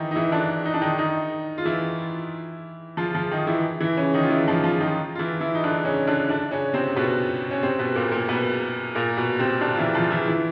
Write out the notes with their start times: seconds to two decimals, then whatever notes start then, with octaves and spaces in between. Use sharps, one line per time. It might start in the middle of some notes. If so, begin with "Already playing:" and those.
Already playing: D#3 E3 D#4 E4
0.11 D#4
0.15 E3 E4
0.32 D3 D4
0.65 D#4
0.74 D4
0.81 D#3 D#4
0.98 D#3 D#4
1.58 F4
1.65 E3 E4
2.97 F3 F4
3.14 F3 F4
3.31 D#3 D#4
3.47 E3 E4
3.80 E3 E4
3.97 C#3 C#4
4.14 D#3 D#4
4.23 F4
4.30 E3 E4
4.48 F3 F4
4.64 F3 F4
4.80 D#3 D#4
5.15 F4
5.19 E3 E4
5.41 E3 E4
5.55 D#4
5.64 D3 D4
5.85 C#3 C#4
6.07 D3 D4
6.29 D3 D4
6.51 C#3 C#4
6.73 C3 C4
6.96 B2 B3
7.51 C#4
7.63 C3 C4
7.79 B2 B3
7.95 A#2 A#3
8.11 A#2 A#3
8.29 B2 B3
8.95 A#2 A#3
9.17 B2 B3
9.39 C3 C4
9.61 D3 D4
9.74 F4
9.78 E3 E4
9.95 F3 F4
10.11 E3 E4
10.28 E3 E4